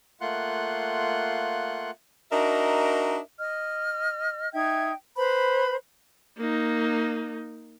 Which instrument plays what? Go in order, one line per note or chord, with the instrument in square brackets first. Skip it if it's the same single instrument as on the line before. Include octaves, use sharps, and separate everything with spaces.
[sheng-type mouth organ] A3 A#3 F4 F#5 C6 F#6
[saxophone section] D4 D#4 F#4 A#4 D#5 E5
[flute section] D#5 F6
D#4 E5 G5 G#6
B4 C5 A#5 B5
[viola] A#3 D#4